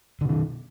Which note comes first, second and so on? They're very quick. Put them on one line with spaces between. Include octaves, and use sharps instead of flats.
D3 B2 D#3